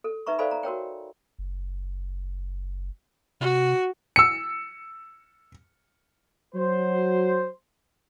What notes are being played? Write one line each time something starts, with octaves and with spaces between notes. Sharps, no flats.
A4
D#4 B4 E5 A#5 C#6
A4 C5 D5 F5 G#5 B5
A#5
F#4 A#4 C#5 G5
F#1
C3 F#4
E6 C#7
F#3 C5